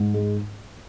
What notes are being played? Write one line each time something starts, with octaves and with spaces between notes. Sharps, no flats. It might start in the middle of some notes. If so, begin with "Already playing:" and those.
Already playing: G#2
G#3